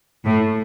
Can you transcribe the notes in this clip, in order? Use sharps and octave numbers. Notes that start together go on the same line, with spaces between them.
A2